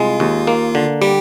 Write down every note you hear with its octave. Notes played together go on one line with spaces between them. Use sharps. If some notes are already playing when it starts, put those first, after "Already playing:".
Already playing: C2 G#3 F4
D#2
A#3
D3
G3 G4